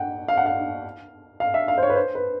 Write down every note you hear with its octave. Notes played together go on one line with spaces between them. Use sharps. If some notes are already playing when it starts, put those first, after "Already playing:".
Already playing: F#5 G5
F5
F#5
F5
F5
E5
F5
C5
C#5
B4
C5
B4